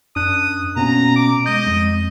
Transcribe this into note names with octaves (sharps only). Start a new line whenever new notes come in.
F#2 D4 D#6 F#6
B2 A#3 B3 C#4 A#5
D6
G#3 D#5 G6
F2 G#3